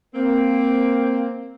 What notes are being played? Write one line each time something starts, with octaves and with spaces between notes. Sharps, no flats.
A#3 C4